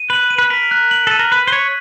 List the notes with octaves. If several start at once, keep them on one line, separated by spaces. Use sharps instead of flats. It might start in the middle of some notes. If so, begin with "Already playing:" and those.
Already playing: D#7
B4 F#7
D#7
B4
A#4 B6
F#6
F#7
A4 D#7
A#4
B4 D#7
C5
C#5 B6